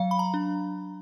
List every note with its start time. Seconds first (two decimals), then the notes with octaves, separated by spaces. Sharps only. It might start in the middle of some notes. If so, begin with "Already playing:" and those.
Already playing: F#3 F5
0.11 B5
0.19 A#5
0.34 D4